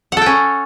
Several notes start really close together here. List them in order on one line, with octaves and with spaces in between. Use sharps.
F#5 A4 G5 C#4